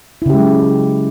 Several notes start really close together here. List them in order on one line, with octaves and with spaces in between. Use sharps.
E4 C#3 G4 G#3 F#3